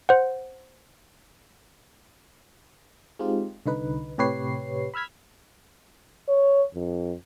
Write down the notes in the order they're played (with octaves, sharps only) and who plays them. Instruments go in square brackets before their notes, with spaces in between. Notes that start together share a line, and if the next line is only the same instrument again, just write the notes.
[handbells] C5 F#5
[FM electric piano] G#3 C4 D#4 F4 G4
C2 D3 D#4 B4
A2 C3 G4 B4 C#5 C7
B5 E6 F6 G#6 B6
[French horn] C#5
F2